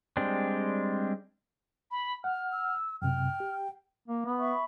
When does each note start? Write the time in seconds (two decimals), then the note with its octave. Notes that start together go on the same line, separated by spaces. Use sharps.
0.17 G3 G#3 C4 D4
1.91 B5
2.24 F#5 F6
2.52 E6
3.02 F#2 C3 G5 F6
3.40 G4
4.08 A#3
4.25 B3
4.38 E5 B5 C#6